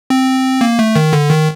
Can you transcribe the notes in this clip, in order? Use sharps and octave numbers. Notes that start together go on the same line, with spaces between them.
C4
A#3
A3
D#3
D3
D#3